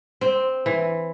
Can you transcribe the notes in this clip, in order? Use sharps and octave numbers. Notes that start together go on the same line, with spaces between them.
C4
E3